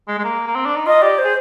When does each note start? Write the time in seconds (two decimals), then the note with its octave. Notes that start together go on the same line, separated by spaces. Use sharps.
0.08 G#3
0.19 G#3
0.24 A#3
0.47 A#3
0.55 C4
0.66 D4
0.76 D#4
0.86 F4 D#5
1.02 G4 D5
1.18 C5
1.25 G#4